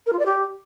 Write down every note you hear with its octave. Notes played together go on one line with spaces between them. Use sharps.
A#4
F4
D5
G4